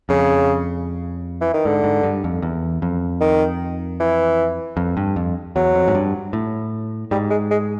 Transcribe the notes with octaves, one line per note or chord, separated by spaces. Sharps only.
F2 C#3
E3
D#3
G#2 D3
G#2
G2
F2
E2
F2
D#3
E3
F2
G2
F2
E2 F#3
F2
G#2
G2
A2
G#2 G3
G#3
G#3